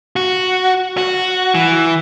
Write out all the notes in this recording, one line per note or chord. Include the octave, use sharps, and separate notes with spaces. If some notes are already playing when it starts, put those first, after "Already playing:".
F#4
F#4
E3